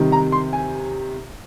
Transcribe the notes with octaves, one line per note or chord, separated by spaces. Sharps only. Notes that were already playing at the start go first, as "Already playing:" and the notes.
Already playing: C3 D#3 G3
A#5
C6
G#5